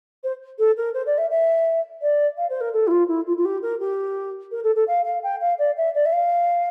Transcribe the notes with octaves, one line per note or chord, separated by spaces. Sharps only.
C5
A4
A#4
C5
D5
E5
E5
D5
F5
C5
A#4
A4
E4
F4
E4
F4
F4
G4
A#4
G4
A#4
A4
A4
F5
F5
G5
F5
D5
E5
D5
E5
F5